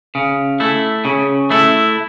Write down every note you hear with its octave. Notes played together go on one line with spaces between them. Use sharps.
C#3
A3 E4
C#3
A3 E4